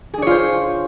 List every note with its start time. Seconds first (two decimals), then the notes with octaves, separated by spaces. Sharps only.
0.14 G#4
0.18 D4
0.22 C#5
0.27 F4
0.31 C5